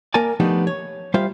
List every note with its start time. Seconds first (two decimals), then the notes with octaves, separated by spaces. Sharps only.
0.14 A#3 A#4 D5 G#5 A5
0.40 F3 A3 B3 D4 D#4 G4
0.67 C#5
1.14 G3 F4 C5 E5 F5